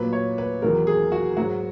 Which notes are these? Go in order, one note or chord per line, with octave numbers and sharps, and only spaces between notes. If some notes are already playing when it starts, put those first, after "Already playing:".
Already playing: A#2 F#3 B4
C#5
B4
E2 D#3 F#3 A#4
G#4
F#4
G#2 F#3 F#4